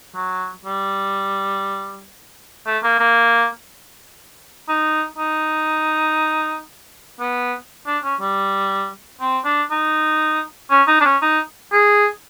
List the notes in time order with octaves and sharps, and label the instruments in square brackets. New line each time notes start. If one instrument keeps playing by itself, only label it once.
[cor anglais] F#3
G3
A3
A#3
A#3
D#4
D#4
B3
D4
C#4
G3
C4
D4
D#4
C#4
D#4
D4
C#4
D#4
G#4